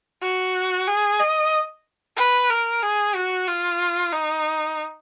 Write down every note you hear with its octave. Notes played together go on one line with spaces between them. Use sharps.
F#4
G#4
D#5
B4
A#4
G#4
F#4
F4
D#4